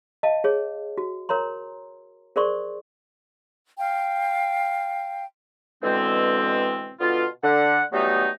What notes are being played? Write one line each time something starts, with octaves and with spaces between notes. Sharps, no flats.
D#5 F5 A5
G#4 C#5
F#4
A#4 C#5 A#5 C6
G#4 A#4 C5 D5 C6 C#6
F5 G5
B2 D3 E3 G#3 C4
B2 D3 B3 F4
D3 F#5
E3 F#3 G3 A3 B3 D#4